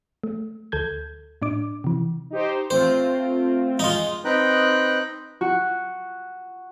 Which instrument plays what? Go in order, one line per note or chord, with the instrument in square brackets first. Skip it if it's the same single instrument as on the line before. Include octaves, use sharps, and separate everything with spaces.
[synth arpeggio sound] A3
D2 A4 G6 G#6
A2 D4 D6
C3 E3
[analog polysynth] D#4 G4 C5
[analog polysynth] A3 C4 F4 [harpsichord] C5
[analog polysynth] G#3 [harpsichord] D#4 F4
[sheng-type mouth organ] C4 D#4 B4 G5 A#5 F#6
[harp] F#4